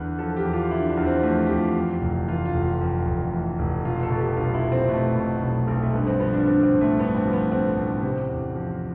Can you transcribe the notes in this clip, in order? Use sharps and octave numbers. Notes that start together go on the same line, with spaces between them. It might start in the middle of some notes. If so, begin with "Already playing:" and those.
Already playing: E2 D3 B4
F3 A4
G4
E2
F4
D3 E4
D4
E2
C4
F3 A3
E2 G4
F4
F2
F1
E3 F4
F4
F1
F4
F2
F1
E3
F1
B2 F4
A4
B2
G4
B1 F4
E4
B1
C4
B2 A3
B2
B1
B1
A3
G2 B3
C4
F3 B3
D4
D3 C4
C4
A1
A3
G2 B3
C4
F3
B3
D3 C4
A1
C3
E2
F3